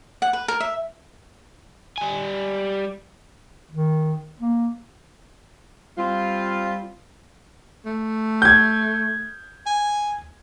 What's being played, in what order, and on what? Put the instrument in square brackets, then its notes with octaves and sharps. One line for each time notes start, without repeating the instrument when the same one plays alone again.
[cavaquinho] F#5
B4
A#4
E5
[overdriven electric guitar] G3 G#5
[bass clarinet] D#3
A#3
[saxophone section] G3 C4 F4
[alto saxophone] A3
[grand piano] G6 G#6
[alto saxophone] G#5